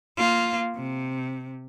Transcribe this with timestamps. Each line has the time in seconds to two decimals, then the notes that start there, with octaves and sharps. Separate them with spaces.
0.18 A#3 F4
0.75 C3